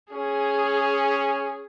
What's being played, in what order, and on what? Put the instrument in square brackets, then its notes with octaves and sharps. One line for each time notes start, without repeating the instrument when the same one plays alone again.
[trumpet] C#4 [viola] G#4